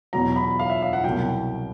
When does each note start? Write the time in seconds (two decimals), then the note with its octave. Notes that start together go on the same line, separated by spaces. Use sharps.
0.13 E2 B2 F#3 A#5
0.36 B5
0.59 F5
0.70 E5
0.82 F5
0.93 F#5
1.04 C2 B2 F#3 G5